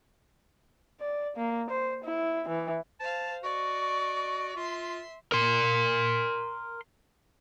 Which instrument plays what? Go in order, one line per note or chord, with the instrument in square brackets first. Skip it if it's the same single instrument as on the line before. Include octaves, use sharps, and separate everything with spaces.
[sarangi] D5
A#3
C5
E4
E3
[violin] C5 F5 [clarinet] A5
[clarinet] F#4 [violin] D5 D#5 [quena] C#6
[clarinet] F4 [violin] E5 C6
[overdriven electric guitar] A#4 C6